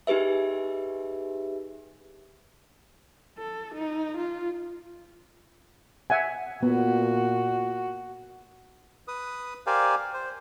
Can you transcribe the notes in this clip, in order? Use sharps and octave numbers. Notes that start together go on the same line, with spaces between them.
D#4 G4 G#4 B4 E5
A4
D#4
F4
E5 F#5 G#5
A#2 B3 F#4
B4 D#6
G4 A#4 C5 D5 F5 G#5
C5